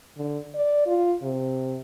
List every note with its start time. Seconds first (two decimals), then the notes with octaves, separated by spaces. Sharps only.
0.17 D3
0.55 D5
0.87 F4
1.23 C3